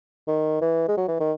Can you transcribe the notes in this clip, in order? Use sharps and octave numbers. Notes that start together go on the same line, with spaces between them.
D#3
E3
G#3
F#3
E3
D#3